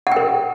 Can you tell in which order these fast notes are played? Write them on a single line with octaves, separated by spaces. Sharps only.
F#5 G5 A#4